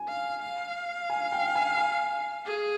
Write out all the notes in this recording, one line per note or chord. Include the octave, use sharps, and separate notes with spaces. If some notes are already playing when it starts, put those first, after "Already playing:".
Already playing: G#5
F5
F5
G#5
G5
G#5
G#5
G#4